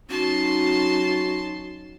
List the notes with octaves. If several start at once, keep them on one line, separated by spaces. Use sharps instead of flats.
F#3 C#4 D#4 F#4 A5 C6